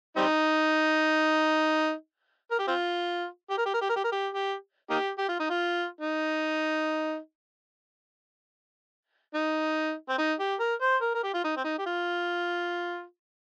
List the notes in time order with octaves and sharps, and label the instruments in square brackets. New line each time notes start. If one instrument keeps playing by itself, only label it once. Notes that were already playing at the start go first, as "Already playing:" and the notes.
[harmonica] G3 C4 D#4
A#4
G4
C4 F4
G4
A#4
G4
A#4
G4
A#4
G4
A#4
G4
G4
A#3 D#4 G4
G4
F4
D#4
F4
D#4
D#4
C4
D#4
G4
A#4
C5
A#4
A#4
G4
F4
D#4
C4
D#4
G4
F4